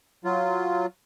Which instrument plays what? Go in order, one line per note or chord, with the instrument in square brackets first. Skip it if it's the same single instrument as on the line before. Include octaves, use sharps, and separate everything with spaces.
[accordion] F#3 F4